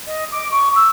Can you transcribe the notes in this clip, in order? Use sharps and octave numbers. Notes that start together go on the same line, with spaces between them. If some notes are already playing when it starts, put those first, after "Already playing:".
D#5
D6
C#6
E6